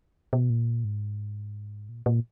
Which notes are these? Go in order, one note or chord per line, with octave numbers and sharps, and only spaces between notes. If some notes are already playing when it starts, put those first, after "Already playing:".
B2
A#2
G#2
A#2
A#2